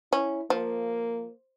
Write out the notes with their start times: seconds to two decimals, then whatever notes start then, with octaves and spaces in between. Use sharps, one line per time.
0.13 C#4 E4
0.50 F3 A#3